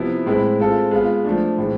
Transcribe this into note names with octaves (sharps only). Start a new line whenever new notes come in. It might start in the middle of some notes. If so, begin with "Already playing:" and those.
Already playing: C3 F3 B3 E4
A2 G#3 C4 E4 B4
G#3 C4 F4 A4
G#3 B3 F4
F3 A3 D4
A2 E3 G#3 C4